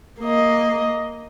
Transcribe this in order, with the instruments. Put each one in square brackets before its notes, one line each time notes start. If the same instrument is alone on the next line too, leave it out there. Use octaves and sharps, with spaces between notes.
[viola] A#3 D#5